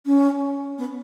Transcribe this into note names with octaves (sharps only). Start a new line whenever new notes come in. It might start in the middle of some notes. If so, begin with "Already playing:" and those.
C#4
B3